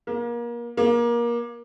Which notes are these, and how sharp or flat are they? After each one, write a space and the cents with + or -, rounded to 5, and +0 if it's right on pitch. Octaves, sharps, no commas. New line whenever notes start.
A#3 +30
A#3 +25